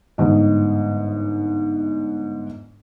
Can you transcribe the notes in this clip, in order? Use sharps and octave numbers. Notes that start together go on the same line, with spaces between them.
G1 G#2 D#5